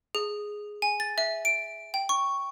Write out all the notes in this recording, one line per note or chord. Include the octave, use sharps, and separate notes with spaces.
G#4
G#5
A6
E5
D7
G5
C#6